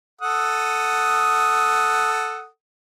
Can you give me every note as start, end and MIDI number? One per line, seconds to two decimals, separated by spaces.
0.21 2.47 69
0.21 2.47 78
0.21 2.47 87